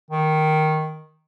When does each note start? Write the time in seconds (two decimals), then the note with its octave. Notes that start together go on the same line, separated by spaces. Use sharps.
0.11 D#3